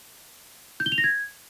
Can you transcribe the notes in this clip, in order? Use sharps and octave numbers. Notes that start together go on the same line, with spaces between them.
G6
G7
F7
A#6
G#6